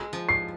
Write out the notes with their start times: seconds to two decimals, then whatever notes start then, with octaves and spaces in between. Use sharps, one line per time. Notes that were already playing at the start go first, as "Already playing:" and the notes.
Already playing: G#3
0.13 F3
0.29 C7